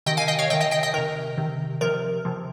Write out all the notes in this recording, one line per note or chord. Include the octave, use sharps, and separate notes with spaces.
C3 D#3 D#5 G5
F5 G#5
D#5 G5
C#5 F5
C3 D#3 D#5 G5
D#5 G5
D#5 G5
D#5 G5
C3 D#3 A#4
C3 D#3
C3 F3 A#4
C3 F3